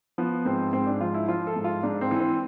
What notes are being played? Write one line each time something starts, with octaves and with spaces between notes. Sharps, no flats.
F3 B3
G#2 C4
G#2 C4
D4
F3 F4
E4
F3 F4
A4
G#2
F4
G#2 D4
C4
E3
C4